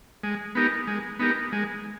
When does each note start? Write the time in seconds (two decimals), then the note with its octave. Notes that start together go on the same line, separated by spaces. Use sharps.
0.24 G#3
0.55 B3 D#4 G4 A#4
0.87 G#3
1.19 B3 D#4 G4 A#4
1.53 G#3